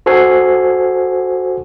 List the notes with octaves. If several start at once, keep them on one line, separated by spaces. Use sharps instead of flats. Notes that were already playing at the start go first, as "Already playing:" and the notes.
F#4 A4 C5 G#5 C7